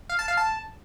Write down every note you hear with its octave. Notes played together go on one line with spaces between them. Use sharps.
F5
A5
F5
A5